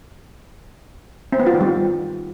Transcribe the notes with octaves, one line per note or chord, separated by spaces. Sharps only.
C4
B3
F4
D#3
G3